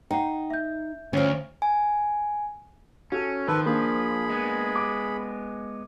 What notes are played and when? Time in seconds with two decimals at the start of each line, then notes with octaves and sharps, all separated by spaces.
0.11 D#4 F#5 G5
0.50 E5 G6
1.13 D2 F3 C#4
1.62 G#5
3.12 C#4 F#4 A4
3.48 D#3 F3 A4 B4 F#6
3.66 A#3 D4 G#4 B5
4.29 G#3 B3
4.76 D6